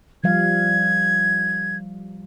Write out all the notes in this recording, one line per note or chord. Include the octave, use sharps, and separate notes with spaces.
F3 G3 F5 G#6